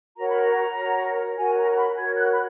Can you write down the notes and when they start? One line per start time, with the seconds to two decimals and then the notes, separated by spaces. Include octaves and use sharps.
0.17 F#4 A#4 C#5 A#5
0.30 B5
0.42 A#5
0.77 F#4 A#4 C#5
1.37 F#4 A#4 C#5 G#5
1.57 A#5
1.71 A#5
1.77 B5
1.97 F#4 A#4 C#5 G#6
2.17 F#6
2.32 B5